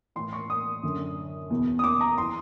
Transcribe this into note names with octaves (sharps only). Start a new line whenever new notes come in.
A2 E3 C6
C#6
D#6
F#2 D3
E2 B2
D#6
D6
A#5
E3 C6